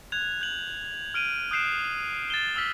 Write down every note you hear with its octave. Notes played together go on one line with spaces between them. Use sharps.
F#6 G#6 F7
G6 F#7
F6 D7 D#7 F#7
D#6 F#6 G6 C7 D7 E7
A6 E7 G7
E6 F6 B6